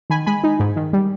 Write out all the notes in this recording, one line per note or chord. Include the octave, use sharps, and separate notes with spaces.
D#3 G#5 B5
G#3 G#5 B5
D#4
G#2
D#3
G3